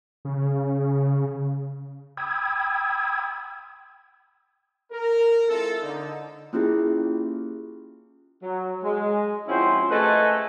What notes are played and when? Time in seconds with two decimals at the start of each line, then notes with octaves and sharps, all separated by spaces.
0.25 C#3
2.17 G5 B5 D#6 E6 G#6
4.92 A#4
5.49 G#3 C4 E4 F4 A4
5.80 D3 D#4
6.53 A#3 C#4 E4 F4 G4 G#4
8.43 F#3
8.84 G#3
9.48 F3 C4 C#4 E4 F#4 C5
9.91 A3 G#4 A4 B4 D#5 G#5